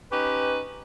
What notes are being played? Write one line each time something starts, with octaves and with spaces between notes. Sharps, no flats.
C#4 D#4 G4 B4